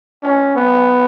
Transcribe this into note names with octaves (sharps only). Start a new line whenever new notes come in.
C#4
B3